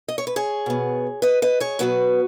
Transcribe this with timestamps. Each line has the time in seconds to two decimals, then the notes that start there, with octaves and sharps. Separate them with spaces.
0.08 D#5
0.18 C#5
0.27 B4
0.36 G#4 C#5
0.66 B2 B3
1.22 B4 D#5
1.42 B4 D#5
1.60 G#4 C#5
1.79 B2 F#3 B3 F#4 B4